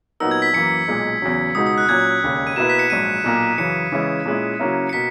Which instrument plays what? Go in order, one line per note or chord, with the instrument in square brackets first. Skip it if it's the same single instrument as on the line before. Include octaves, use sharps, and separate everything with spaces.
[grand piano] A#2 F#3 B3 D#4 A#4 [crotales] E6
[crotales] G#6
B6
[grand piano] F#2 E3 A#3 [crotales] C#7
[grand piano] B1 A#2 G#3
E2 C#3 F#3
[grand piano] C#2 B2 G#3 D#4 F#4 [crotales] D#6
[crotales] D#6
F#6
[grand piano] A#2 F#3 C#4 [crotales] G#6
[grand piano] E1 D#2 C#3
[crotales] D#7
[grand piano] B2 A#3 E4 B4 [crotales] E7
[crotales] B6
C#7
[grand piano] A#1 G#2 F#3 [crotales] D#7
[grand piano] B1 A#2 A#3
[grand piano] F#2 C#3 E3 [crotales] C#7
[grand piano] C#3 E3 G#3 C#4 E4
A#2 G#3 C#4 E4
C#3 F#3 A#3 C#4 E4
[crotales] C#7
[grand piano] B2 A#3 [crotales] B6